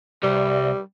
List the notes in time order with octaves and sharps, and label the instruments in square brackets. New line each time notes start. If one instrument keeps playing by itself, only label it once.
[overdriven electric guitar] C2 [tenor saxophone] G3